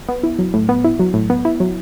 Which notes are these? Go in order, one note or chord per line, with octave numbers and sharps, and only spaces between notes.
B3
E4
F#3
A2
B3
E4
F#3
A2
B3
E4
F#3